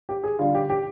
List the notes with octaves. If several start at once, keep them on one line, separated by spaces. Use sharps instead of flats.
G4
G#4
D3 G3 D4 F4
G4
G4